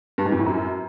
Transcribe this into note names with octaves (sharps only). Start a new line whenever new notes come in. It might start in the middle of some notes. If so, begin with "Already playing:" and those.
G2
G#2
F2
A2
F#2